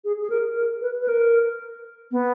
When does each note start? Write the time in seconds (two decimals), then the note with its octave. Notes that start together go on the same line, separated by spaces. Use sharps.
0.04 G#4
0.21 G#4
0.30 A#4
0.57 A#4
0.81 B4
1.01 B4
1.08 A#4
2.11 B3